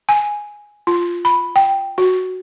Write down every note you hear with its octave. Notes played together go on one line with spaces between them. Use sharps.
G#5
F4
B5
G5
F#4